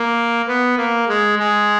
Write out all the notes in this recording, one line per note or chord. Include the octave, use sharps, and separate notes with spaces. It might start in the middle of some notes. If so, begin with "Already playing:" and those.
Already playing: A#3
B3
A#3
G#3
G#3